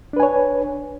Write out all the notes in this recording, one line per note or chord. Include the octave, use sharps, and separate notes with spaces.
D4 B4 C#5 G#5